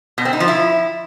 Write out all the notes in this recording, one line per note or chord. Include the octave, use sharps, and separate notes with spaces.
B2
C4
D#4
F3
E4